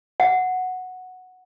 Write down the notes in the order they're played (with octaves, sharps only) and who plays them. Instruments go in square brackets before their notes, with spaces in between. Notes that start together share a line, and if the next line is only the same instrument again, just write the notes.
[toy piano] F#5